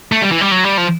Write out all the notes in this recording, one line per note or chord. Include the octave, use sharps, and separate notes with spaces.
A3
G3
E3
G3
F#3
G3
F3